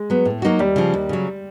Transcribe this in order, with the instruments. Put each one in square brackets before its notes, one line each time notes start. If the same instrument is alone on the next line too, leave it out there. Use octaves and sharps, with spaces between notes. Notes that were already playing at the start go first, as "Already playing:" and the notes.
Already playing: [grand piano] G#3
[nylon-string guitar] F#3 B3
A2
F#3 A#3 D#4 F#4
[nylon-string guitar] D#2 [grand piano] G3
[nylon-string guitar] C#3 F3
D#2
C#3 F#3